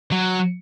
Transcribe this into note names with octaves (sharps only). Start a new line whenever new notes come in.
F#3